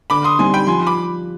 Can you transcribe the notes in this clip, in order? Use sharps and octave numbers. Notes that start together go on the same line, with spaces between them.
D3 B5 D6
C6 D#6
G3 C4 D#4 G#5 C6
G5 B5
F3 G#5 C6
B5 D6